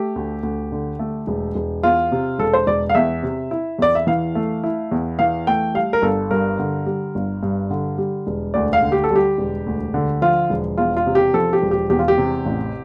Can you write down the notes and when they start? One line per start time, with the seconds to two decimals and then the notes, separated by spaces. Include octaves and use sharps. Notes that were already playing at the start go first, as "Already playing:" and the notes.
Already playing: A3 G4
0.16 D2
0.43 D2
0.72 D3
0.99 A3
1.27 E1
1.55 E1
1.83 E2 F4
2.12 C3
2.39 E1 A4
2.53 C5
2.67 E1 D5
2.89 F5
2.95 E2 E5
3.23 C3
3.51 E4
3.79 E2 D5
3.95 E5
4.07 E3 F5
4.35 A3
4.64 E4
4.91 E2
5.19 E3 F5
5.47 A3 G5
5.74 G3 F5
5.93 A#4
6.02 G1 A4
6.31 G2 A#4
6.59 D3
6.86 G3
7.15 G1
7.43 G2
7.70 D3
7.98 G3
8.27 E1
8.54 D2 D5
8.73 F5
8.82 D3
8.92 G4
9.04 A4
9.10 G3
9.16 G4
9.38 E1
9.66 D2
9.94 D3
10.22 F3 F4
10.50 E1
10.77 E2 F4
10.97 F4
11.06 C3
11.15 G4
11.34 F3 A4
11.53 G4
11.62 E1
11.71 G4
11.90 E2 G4
11.99 F4
12.08 G4
12.18 C3
12.46 A1